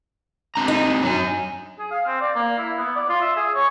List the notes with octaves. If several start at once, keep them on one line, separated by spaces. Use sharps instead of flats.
C4 D4 A#5
D#4
F#3 G#5
G#4
F5
C4
D5
A#3
E4
B3
D5
F4
E5
G#4
C#5